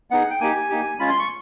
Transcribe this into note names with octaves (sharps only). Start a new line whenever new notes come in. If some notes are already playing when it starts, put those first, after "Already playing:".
B3 D#4 G#4 F#5
F#5
G5
A#3 D#4 G4 G#5
A#3 D#4 G4
G#3 C#4 F4 B5
C6
C#6